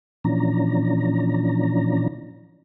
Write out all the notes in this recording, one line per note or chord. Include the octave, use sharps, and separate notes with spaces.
A#2 E3 F3 C#4 D4 A#5